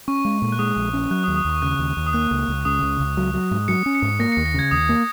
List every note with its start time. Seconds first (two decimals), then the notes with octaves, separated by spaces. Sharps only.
0.08 C#4 C#6
0.25 G#3
0.42 A#2
0.52 F#6
0.59 G#3 D#6
0.76 A#1
0.93 C#4
1.11 F#3 F#6
1.24 D#6
1.28 D#2
1.36 D#6
1.45 D#2 C#6
1.62 C#3 F#6
1.79 D#2
1.97 D#2
2.06 D#6
2.13 A#3 F#6
2.31 C#2
2.48 C#2
2.65 C#3 D#6
2.82 C#2
3.00 C#2
3.17 F#3
3.34 F#3
3.51 G#2
3.68 F#3 C#7
3.86 C#4
3.95 C#7
4.02 G#2
4.19 A#3 A#6
4.32 C#7
4.37 D#2
4.45 A#6
4.54 C#3 G#6
4.71 D#2 D#6
4.89 A#3